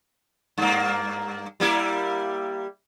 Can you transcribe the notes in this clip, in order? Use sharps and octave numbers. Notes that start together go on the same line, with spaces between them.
G2 A#3
G3 A#3 E4